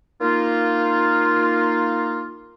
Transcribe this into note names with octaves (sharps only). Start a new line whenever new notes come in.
A#3 D#4 F4